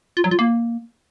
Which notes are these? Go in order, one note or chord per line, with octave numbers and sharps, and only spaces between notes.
F4
F#3
F4
A#3